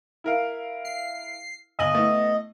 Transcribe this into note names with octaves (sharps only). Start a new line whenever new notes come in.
E4 A#4 F5
C7
G1 D#5 G#5 F#7
A3 B3 E4